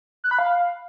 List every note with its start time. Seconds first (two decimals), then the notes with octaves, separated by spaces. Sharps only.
0.24 F#6
0.31 B5
0.39 F5